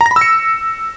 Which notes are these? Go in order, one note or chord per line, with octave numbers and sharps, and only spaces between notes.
A#5
A#6
B5
E6
C#7